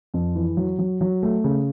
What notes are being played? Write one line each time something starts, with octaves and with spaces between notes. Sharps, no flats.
F2
E3
F#3
F#3
F#3
A3
C#3